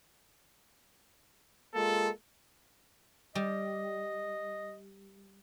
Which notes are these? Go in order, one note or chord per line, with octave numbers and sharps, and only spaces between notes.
G#3 A#3 F4 A4
G3 D#5